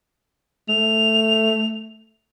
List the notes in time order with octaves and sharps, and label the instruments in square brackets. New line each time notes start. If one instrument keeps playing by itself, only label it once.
[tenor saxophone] A3 [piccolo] F7